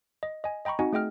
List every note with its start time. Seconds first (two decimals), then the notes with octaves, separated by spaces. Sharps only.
0.23 D#5
0.44 D#5 G#5
0.65 D#5 G5 A#5 B5 C#6
0.79 C4 D#4 F#4 D#5 F#5 G#5
0.93 A3 G#4 D#5 G5 F6